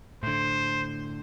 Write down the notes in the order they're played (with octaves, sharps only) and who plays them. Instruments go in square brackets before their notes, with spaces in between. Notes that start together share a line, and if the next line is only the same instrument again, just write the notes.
[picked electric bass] A2 D3 [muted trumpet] C5